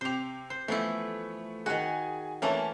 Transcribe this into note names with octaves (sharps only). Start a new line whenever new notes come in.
C3 G4 C5 F7
C5
E3 F3 A3 B3 E4
D#3 F#4 G#4 G#5
E3 A3 A#3 C#4 A5